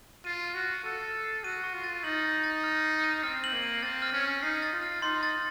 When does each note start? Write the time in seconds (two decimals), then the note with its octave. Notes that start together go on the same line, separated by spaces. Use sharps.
0.25 F4 D#7
0.45 F6
0.54 F#4
0.65 F6
0.84 A4 D#7
1.05 F6
1.24 C7
1.44 F#4 D#7
1.64 C#6
1.74 F4
1.84 A6
2.04 D#4 F#7
2.24 A6
2.44 A6
2.64 F6
2.83 C7
3.04 D#7
3.23 C4 F6
3.44 F#7
3.53 A#3
3.62 D#7
3.82 C4 A6
4.02 F6
4.13 C#4
4.23 F6
4.43 D#4 C7
4.62 A6
4.73 F4
4.83 F6
5.02 D#4 C6
5.23 A6